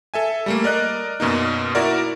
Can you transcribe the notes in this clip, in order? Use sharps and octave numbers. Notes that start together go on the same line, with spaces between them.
A4 E5 G#5
G3 A3 A#3
A#4 D5 D#5 F#6
F#2 B2 A#3 D#4
E4 F#4 A#4 D5